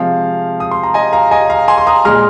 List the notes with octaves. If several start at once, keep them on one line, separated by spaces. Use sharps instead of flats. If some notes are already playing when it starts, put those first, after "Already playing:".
Already playing: C3 F3 G#3 F5
D#6
C6
A#5
D#5 G#5
F5 A#5
D#5 G#5
F5 A#5
G#5 C6
C6
A#5 D#6
A#2 G#3 C6 F6